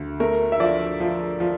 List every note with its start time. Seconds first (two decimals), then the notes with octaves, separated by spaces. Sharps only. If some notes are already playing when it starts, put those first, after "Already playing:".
Already playing: D2
0.20 A3 A#4
0.52 E5
0.60 F3 D5
1.00 F3
1.40 F3